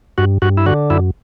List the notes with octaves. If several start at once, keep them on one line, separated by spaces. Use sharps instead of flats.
G2 F#4
G2 F#4
E4
D3 F#4
F#2 E4